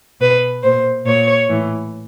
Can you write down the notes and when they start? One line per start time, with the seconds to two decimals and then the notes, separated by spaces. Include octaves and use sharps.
0.20 B2 B4
0.63 A#2 C5
1.05 A#2 C#5
1.48 A2 E3